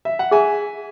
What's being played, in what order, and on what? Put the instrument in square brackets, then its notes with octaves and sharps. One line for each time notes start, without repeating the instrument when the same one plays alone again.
[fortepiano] E5
F#5
[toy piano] G#4 [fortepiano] E5 G#5